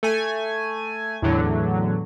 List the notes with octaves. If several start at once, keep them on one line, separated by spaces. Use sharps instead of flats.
A3 G#5
E2 A2 D3 F#3